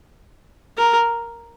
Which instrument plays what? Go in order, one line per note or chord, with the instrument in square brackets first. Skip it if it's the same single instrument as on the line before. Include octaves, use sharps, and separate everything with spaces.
[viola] A#4